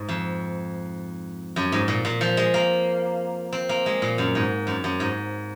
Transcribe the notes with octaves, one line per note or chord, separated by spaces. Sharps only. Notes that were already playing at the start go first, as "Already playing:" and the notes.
Already playing: G#2
F2
F#2
G#2
A#2
A#2
F3
G#3
A#3
C4
A#3
G#3
A#2
F#2
G#2
F#2
F#2
G#2